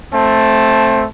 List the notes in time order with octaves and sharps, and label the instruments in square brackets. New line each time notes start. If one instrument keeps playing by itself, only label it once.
[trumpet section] A3 C4 A5